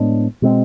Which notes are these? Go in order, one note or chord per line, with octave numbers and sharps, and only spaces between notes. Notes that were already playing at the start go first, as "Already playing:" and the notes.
Already playing: A2 G#3 B3 D4
B2 G#3 C4